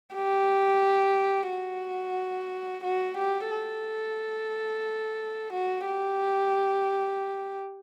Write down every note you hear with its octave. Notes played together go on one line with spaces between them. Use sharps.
G4
F#4
F#4
G4
A4
F#4
G4